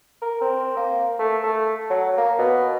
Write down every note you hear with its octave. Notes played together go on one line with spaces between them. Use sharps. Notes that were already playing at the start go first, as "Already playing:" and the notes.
A#4
C4
A#3
A3
A3
F#3
A#3
B2